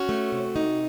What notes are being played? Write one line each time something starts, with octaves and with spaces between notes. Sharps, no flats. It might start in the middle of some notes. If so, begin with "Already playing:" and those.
Already playing: C#4 F#4
A3
C3
D#4